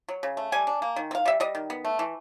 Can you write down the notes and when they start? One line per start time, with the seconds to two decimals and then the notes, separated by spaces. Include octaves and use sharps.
0.09 F#3
0.23 C#3
0.37 A3
0.52 G3 G#5
0.67 D4
0.82 A#3
0.96 D#3
1.11 C4
1.15 F5
1.26 G3 E5
1.40 G3 D#5
1.55 D#3
1.70 B3
1.85 A3
1.99 E3